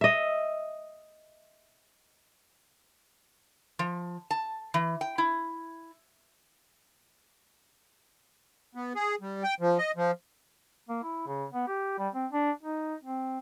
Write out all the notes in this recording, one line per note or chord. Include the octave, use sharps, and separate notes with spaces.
D#5 E5
F3
A5
E3
G5
E4
B3
G#4
G3
G5
F3
D#5
F3
A#3
E4
C#3
B3
G4
G3
C4
D4
D#4
C4